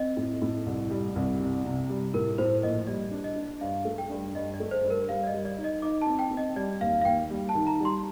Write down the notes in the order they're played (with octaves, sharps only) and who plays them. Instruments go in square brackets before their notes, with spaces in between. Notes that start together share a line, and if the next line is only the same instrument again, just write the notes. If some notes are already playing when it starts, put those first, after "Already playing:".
Already playing: [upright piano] C4 [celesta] D#5
[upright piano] A2
A2
C2
G3
C2
C3
C3
G3
[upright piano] A2 [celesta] A#4
[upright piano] A2 [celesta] C5
[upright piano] A#1 [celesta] D#5
[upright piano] G3 [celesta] D5
[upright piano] D4
[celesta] D#5
[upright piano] D4
[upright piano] G2 [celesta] F5
[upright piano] A3
[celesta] G5
[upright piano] G2
[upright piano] G2 [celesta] D#5
[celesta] D5
[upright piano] A3
[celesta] C5
[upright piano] G2
[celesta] A#4
[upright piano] G3 [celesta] F5
[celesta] D5
D#5
[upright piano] G3
[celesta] D5
[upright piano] D#4
[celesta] D#5
[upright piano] D#4 [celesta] D6
[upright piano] C4 [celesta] A5
[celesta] G5
[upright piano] C4
[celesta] D#5
[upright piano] G3 [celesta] D5
[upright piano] D#2 [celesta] F5
[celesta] F5
[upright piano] D#2 [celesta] G5
[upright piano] G3
[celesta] A5
[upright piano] D#3
[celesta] A#5
[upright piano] G3
[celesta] C6